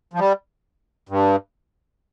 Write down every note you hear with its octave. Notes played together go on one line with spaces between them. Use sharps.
F3
G3
G2